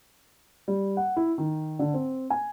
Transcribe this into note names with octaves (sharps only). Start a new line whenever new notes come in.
G3
F#5
E4
D#3
D3
C4
G#5